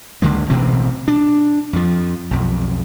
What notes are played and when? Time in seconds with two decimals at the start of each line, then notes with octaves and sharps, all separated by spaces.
0.22 C#2 D3 G#3 A#3
0.50 A1 B2 E3 C4
1.08 D4
1.73 F2 F3
2.31 B1 F2